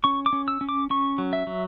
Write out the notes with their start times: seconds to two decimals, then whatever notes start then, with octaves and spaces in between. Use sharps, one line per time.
0.04 C#4 C#6
0.26 D6
0.33 C#4
0.48 E6
0.61 C#4
0.69 D6
0.90 C#4 C#6
1.18 F#3
1.33 E5
1.47 F#3